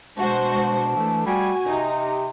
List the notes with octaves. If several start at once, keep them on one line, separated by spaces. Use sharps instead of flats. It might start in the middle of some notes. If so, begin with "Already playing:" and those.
B2 G#3 D4 F#4 C5
E3 A3
G3 F#4 G#5
C3 D#4
G4